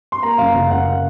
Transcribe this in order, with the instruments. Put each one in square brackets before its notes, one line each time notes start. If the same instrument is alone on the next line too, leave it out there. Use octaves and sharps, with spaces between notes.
[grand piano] C6
A#3 A#5
F#2 F5
F#1 F5
F#1 F#5